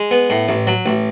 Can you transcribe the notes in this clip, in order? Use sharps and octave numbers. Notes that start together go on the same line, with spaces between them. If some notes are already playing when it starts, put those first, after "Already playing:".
Already playing: G#3
B3
A2
A1
F#3
A1